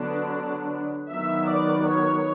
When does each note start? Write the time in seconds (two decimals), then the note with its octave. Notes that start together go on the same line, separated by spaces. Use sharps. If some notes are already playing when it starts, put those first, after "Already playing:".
Already playing: D3 F#3 B3 D4
1.11 D#3 F#3 B3 E5
1.50 D5
1.88 C#5